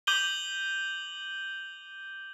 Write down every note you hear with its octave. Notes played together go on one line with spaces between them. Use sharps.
D6 G6 D#7 F#7 G7